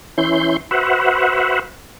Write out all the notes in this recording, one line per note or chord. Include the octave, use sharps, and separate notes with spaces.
E3 C#4 E4 C6 G6
F#4 B4 C5 E5 F#5